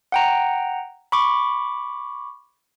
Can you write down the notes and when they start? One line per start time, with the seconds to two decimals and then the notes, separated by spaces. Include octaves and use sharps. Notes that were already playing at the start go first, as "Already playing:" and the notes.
0.12 F#5 G5 A#5
1.12 B5 C#6 D6